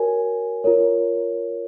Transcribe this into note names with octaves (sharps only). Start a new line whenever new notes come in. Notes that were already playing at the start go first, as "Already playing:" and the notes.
Already playing: F#4 A#4 C#5 G#5
F4 A#4 C#5